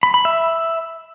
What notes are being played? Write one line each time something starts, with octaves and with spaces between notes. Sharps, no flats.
B5
B5
E5